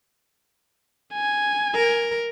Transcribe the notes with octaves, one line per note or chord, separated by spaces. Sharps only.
G#5
A#4